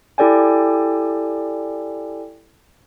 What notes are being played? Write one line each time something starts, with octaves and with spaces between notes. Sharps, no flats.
E4 G4 A4 D5 G5 G#5